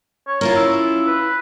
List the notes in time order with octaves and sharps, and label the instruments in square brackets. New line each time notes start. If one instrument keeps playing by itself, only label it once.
[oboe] C#5
[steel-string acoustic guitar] C#4 E4 F4 [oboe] A#4
[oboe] E6
B4